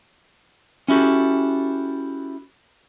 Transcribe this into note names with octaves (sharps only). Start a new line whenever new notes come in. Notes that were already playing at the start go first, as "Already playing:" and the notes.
C#4 E4 F#4 G4 A4